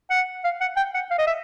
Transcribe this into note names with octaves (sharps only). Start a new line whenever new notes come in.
F#5
F5
F#5
G5
F#5
F5
D#5
E5